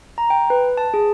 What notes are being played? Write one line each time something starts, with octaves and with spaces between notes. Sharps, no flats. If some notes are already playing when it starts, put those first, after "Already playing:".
A#5
G5
B4
A5
G#4